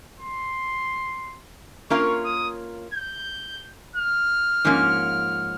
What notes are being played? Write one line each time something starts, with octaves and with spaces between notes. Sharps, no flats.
C6
A#3 C#4 F4 A#4 F5 C#6
D#6
G6
F6
G#2 F3 A#3 C#4